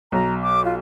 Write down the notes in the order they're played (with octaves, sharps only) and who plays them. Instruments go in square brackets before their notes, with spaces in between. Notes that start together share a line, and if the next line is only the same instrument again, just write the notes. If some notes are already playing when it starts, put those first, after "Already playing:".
[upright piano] B1 [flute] A#5
[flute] D6
F4